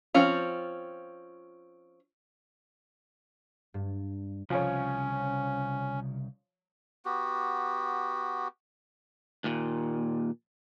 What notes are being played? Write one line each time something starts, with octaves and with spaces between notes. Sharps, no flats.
F3 C4 C#4 F4
G2
C2 C#3 F3 C#4 C#5
B3 F#4 G4
D#2 A#2